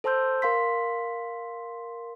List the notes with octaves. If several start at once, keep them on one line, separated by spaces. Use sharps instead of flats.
A4 C5 A5 C6 E6 G6
A#4 F5 C6 B6